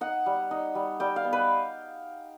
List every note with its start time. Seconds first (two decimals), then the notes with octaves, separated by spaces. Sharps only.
0.01 D#4 F#5
0.26 G3
0.51 D#4
0.75 G3
1.00 G3 G5
1.16 F5
1.24 B3
1.33 B4